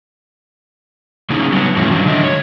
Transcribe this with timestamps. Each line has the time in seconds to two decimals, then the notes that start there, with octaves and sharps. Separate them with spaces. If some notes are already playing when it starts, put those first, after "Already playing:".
1.30 C#3 F#3 A#3 C#4 D#4 G#4
1.52 F#3 G3 A#3 B3
1.76 G#2 B2 F3 A3 C#4 E4
1.91 G2 D#3 F#3 D4
2.06 D3 G#3 D4 D#5 E5
2.22 C#5